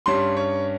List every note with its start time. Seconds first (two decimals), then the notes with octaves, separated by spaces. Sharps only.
0.06 G2 G3 C#4 C6
0.37 C#5